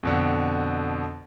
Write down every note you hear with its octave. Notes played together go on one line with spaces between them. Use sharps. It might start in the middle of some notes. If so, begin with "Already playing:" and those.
F2 B2 D3